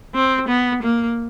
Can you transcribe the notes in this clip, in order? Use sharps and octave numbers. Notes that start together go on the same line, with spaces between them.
C4
B3
A#3